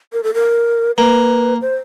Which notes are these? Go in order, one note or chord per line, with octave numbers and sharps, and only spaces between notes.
A#4
A4
A#4
A#3 B4
C5